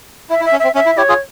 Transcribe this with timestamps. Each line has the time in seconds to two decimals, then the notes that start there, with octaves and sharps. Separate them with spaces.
0.30 E4 E5
0.41 E4
0.45 E5
0.52 C#4
0.60 C4 E5
0.75 C#4 E5
0.86 E4
0.97 E4 G4 C#5
1.09 F4 G#4